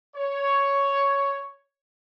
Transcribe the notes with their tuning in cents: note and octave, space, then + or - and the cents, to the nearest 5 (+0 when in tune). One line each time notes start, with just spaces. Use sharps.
C#5 +5